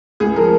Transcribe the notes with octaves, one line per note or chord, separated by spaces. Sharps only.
C#2 G#4
F3 A#4